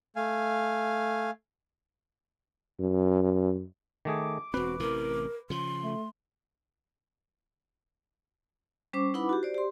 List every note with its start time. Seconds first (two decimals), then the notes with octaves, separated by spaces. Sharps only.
0.16 A3 F5 G#5
2.79 F#2
4.05 D#3 A3 G#4 D6
4.54 E1 C4 F#4 B4
4.80 A1 C3 E3 A#4
5.50 C#3 F3 C6
5.83 A3
8.93 G3 C#4 C5 C#6 D6
9.14 D#4 E4 B4 F#5 B5 D6
9.29 F#4 G4
9.43 C5 D5
9.55 G4 C6